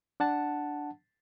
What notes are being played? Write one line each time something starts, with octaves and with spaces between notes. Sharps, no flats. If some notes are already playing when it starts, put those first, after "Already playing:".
D4 F#5 A5